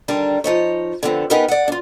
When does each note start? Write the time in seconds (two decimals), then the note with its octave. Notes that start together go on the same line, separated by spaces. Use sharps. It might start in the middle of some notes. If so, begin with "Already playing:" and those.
0.08 D3 D#3 G3 D4 A#4
0.44 F3 D#4 C#5
1.03 D3 F3 B3 C4
1.30 B3 D#4 G4 G#4 A#4 B4
1.48 D5 F#5
1.68 D4 F4